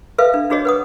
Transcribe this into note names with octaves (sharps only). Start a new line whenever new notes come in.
A4 B4 E5 F5
D4
D4 F#4 G#4 C#5 D#5
B4 F#5 D#6